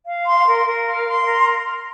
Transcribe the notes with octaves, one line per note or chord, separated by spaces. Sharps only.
F5
C6
A#4
A#4
F5
C6
A#4